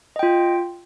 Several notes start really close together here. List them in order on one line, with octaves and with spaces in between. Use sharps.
D#5 G5 F4